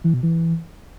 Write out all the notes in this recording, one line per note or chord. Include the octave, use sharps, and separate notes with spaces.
E3
B2
E3